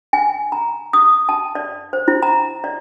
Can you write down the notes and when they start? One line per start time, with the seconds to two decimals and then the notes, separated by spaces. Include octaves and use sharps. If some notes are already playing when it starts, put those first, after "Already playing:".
0.13 G#5
0.52 A#5
0.93 D#6
1.29 A5
1.55 D5
1.93 C5
2.08 E4
2.23 A#5
2.64 D5